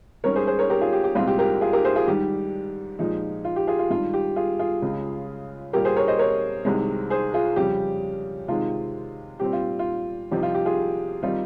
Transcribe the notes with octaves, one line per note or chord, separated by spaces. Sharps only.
G#2 G3 C#4 A#4 C#5
G#4 C5
G#4 C5
A#4 C#5
G4 A#4
F4 G#4
G4
G4
C2 A#2 G#3 C4 F4
G4
G4 A#4
F4 G#4
G4 A#4
G#4 C5
F4 G#4
G#2 D#3 G3 G4
A#2 F3 G#3 D#4
F4
G4
F4 G#4
F4
G2 D#3 G#3 F4
G4
F4 G#4
F4 G#4
C#2 C#3 G#3
A#2 G3 A#3 G4 A#4
G#4 C5
A#4 C#5
C5 D#5
A#4 C#5
C2 C3 D#3 G#3
G#4 C5
F4 G#4
F2 C#3 G3 G4
C3 D#3 G#3 F4
A#2 G3 C4 G4
F4
F4
C2 C3 F3 C4 D#4 G4
F4
G4
F4 G#4
D#3 G3 C4 D#4 F4